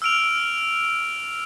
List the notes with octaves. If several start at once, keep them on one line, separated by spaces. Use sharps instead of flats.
E6 F6 D7 F7